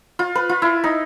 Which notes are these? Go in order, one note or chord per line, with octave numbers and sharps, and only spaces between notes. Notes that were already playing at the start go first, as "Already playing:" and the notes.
F4
B4
F4
E4
D#4